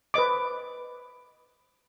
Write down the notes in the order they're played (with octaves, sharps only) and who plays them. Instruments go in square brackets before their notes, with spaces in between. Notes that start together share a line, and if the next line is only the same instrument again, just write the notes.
[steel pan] B4 C5 D#5 D6